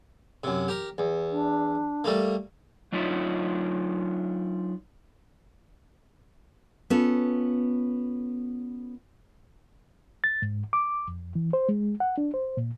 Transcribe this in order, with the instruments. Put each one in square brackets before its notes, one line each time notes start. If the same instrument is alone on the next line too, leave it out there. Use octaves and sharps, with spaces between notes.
[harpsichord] F#2 C3
G4 A#4
E2
[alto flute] D4
[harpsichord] G3 A3 A#3
[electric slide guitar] F#3 D4 D#4 F4 C#5 E5
[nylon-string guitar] B3 C#4 F4 A4
[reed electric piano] A6
G#2
D6
F2
E3
C5
G#3
F#5
D4
C5
A#2